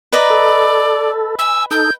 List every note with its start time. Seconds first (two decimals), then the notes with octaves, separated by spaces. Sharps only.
0.12 B4 D5 D#5 A#5
0.30 A4
1.39 G#5 E6
1.71 D#4 A4 G6